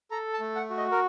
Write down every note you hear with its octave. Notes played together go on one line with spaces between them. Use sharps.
A4 A#5
A5
A3
F#5
F#4
D#5
A#4